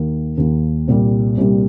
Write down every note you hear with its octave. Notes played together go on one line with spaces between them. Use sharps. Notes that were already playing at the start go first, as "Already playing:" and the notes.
Already playing: D#2 D#3 A#3
D#2 D#3 A#3
C2 A#2 G3
C2 A#2 G3